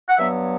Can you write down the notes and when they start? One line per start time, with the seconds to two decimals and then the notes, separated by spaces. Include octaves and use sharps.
0.09 F#5
0.17 G2 F#3 B3 E5